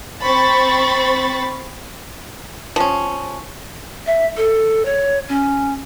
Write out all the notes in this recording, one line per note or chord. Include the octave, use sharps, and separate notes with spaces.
C4 C5 B5 C#6 A6
F3 C#4
E5
A4
C#5
C#4